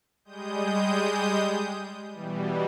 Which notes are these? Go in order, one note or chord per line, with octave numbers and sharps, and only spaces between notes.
G3 G#3 D#6 G6
B2 E3 G3